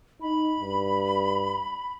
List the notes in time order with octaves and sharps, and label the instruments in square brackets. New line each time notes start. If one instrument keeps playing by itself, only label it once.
[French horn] D#4 [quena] B5
[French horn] G2